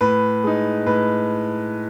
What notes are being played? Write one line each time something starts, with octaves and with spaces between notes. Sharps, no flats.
A2 B4
G#3 D#4
A2 B4